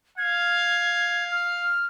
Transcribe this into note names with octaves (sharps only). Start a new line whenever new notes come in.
F5 G#6
F6